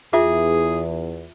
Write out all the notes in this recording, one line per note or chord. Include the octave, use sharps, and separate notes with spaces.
E2 F4 G#4 E5 D6